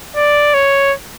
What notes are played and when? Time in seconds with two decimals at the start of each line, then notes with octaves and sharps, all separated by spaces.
0.17 D5
0.54 C#5